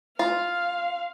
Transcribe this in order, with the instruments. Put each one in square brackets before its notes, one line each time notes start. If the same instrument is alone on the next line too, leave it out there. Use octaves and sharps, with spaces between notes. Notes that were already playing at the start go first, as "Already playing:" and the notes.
[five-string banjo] F4 [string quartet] F5